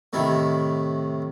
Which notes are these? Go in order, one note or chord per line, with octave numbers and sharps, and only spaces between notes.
A2 C3 D#3 E4